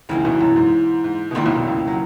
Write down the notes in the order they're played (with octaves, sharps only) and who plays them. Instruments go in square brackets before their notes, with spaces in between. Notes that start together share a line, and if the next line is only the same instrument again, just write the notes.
[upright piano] C#2 C#3 [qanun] E3 A#3 D#4
[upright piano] B1 B2
F#2
G#2
G#2
B2
[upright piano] A#1 A#2 [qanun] D#3 A#3 E4
[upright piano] B1 B2
B1 B2
C#2 C#3
F#3